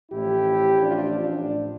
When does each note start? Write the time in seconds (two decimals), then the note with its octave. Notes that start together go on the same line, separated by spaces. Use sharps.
0.12 A1 A2 F3 E4 G4
0.83 D4 F4
1.18 D4 F4